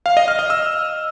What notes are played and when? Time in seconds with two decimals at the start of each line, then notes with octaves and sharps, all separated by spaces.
0.06 F5
0.17 D#5
0.28 F6
0.39 D#5
0.50 E6